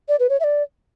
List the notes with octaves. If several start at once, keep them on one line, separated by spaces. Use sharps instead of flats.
D5
B4
C#5
E5
D5